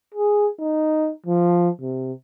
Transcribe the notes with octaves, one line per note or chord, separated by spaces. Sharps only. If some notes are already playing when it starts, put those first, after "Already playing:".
G#4
D#4
F3
C3